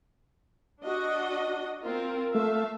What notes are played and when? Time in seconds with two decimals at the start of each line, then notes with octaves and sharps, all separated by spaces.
0.84 D4 F#4 D#5
1.82 C4 F4 A#4
2.35 A3 E5 F5